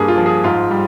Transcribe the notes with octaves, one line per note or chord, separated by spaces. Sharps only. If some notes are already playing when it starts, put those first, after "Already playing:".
Already playing: G2 A#3 G#4
F4
F3
G#4
G#2 F4
G3